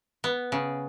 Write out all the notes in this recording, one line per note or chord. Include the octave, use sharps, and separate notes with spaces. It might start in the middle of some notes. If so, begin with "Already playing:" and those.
B3
C#3